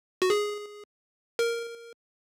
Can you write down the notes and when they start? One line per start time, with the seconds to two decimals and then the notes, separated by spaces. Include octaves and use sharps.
0.22 F#4
0.30 G#4
1.39 A#4